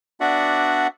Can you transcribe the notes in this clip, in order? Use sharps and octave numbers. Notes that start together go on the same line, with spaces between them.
B3 D4 F#4 D5 E5 F#5